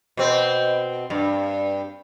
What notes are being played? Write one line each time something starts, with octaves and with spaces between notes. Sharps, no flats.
B2 C4
G2